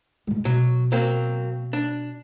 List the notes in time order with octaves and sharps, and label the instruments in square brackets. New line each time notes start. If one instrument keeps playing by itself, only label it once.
[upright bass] A2 G#3
[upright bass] B2 [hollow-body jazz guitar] F#3
[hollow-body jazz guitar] F#3 A#3 C4
D4